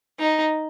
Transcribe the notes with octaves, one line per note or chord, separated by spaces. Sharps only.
D#4